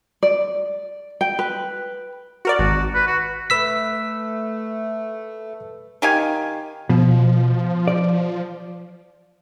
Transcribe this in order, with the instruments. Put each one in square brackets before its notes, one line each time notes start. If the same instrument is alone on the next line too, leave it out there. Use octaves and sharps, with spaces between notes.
[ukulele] D5
G5
B4
[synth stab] F#4 A#4 D5
[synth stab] G#1 [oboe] F#4
[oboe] B4
F#4
[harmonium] A3 [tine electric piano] B4 E6 B6
[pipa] D#3 G4 F5 G#5
[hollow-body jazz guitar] B2 [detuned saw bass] F3
[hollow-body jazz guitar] D5